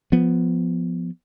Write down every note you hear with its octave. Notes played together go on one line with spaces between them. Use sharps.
F3 B3